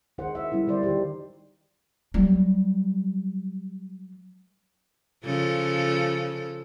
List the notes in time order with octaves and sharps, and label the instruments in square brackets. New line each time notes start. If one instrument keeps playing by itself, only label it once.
[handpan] D#3 D#4 G#4 C5 F#5
E5
G3 C#4 E4
D3 G3 C5 D5
D#3 D#4 G4 C5
[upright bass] F#3 G3
[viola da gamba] C#3 F3 A4